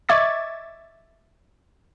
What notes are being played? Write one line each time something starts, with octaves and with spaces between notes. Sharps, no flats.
D#5 E5 C#6 D6 G#6 A6